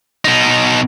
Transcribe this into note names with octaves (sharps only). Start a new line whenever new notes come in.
B2 D#4